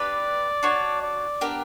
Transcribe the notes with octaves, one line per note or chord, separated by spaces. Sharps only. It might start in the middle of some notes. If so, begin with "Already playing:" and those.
Already playing: D4 G4 B4 D5
D4 F#4 C#5
D5
B3 D4 G4 A#4